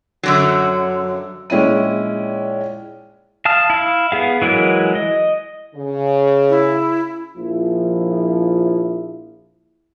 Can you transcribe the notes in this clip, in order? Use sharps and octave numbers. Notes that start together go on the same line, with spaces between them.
F#2 D3 F#3
A#1 G#3 C#4 E4 D#7
F5 A5 D#6 F6
E4 F5
B3 G#4 F5
E3 F#3 G#3 E4 A#4
D#5
C#3
E4
A#1 F3 E4